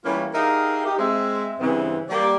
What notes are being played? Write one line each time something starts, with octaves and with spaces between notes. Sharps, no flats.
E3 G3 A3 A#3 C#4 F4
D#4 G4 G#4 A#4 E5 F5
D#4 G4
G#3 C4 E5
G2 C#3 E3 B3 C4
G3 A#3 G4 D5